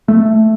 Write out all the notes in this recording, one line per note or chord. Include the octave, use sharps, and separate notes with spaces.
A3